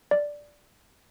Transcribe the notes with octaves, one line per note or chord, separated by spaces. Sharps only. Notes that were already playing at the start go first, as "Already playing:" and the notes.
D5